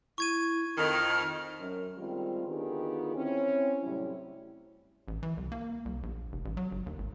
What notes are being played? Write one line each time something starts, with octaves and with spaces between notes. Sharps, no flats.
E4 C#6 G#6 D#7
F2 D#3 D#5 F6
F#2
D#3 G3 G#3 C4 F4
D3 D#3 B3 F4 G4 G#4
C4 C#4 E4
A2 C3 F#3 G3 C#4 E4
A1
E3
C2
A#3
C2
A#1
F1
A1
F#3
G1
D#2
G#1